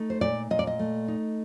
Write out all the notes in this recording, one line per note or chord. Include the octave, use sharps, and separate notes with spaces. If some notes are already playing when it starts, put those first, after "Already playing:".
Already playing: A3 D#4
C5
A#2 D5
A#2 D#5
D5
D#5
A3
D#4